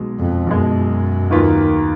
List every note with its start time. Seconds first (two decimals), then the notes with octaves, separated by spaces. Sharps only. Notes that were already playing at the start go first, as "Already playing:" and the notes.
Already playing: B1 B2 G#3
0.19 F2
0.47 B1 F#2 B2 G#3
1.31 D#2 D#3 A#3 F4 B4